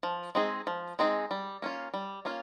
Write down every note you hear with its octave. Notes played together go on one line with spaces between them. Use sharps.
F3
G#3 C4 D#4 G#4
F3
G#3 C4 D#4 G#4
G3
A#3 C#4 F4
G3
A#3 C#4 F4